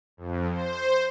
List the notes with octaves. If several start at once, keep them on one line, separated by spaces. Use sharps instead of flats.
F2
C5